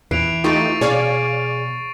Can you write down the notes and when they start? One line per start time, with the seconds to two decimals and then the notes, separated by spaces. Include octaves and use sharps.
0.11 E2 E3 C7 D7 F7
0.44 A3 D#4 F4 G4 C#6 A6 D7
0.81 B2 G#4 C#5 D5 F5